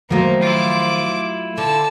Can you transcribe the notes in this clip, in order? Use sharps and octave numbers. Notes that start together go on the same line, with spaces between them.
D#3 F3 F#3 A3 A#3
E4 F4 D6
D3 A5 E6